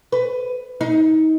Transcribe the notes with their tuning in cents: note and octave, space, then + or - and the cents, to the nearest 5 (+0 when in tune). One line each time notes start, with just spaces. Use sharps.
B4 +20
D#4 +30